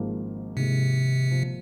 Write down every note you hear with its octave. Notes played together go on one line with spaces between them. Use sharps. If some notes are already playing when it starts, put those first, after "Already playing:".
Already playing: G#1 G#2 F3 A#3
G#1 G#2 C3 F3 A#3
G#1 G#2 F3 A#3